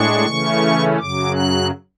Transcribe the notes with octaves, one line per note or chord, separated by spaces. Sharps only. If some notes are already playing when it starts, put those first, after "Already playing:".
Already playing: A2 G#3 D4 C#6
C#3 E3 A3 C#4
F#2 C#3 F#3 D6
F#6